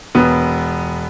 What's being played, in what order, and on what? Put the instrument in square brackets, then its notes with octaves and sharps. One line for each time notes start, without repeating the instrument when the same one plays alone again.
[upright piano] E1 B3